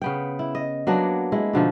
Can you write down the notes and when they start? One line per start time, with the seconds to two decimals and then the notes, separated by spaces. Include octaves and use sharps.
0.02 C#3 B3 G5
0.39 E4
0.55 D#5
0.87 F#3 A#3 B3 D4
1.32 G#3 E4
1.53 B2 D3 F3 D#4